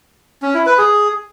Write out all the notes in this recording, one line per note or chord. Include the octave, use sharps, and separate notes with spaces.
C#4
E4
B4
G#4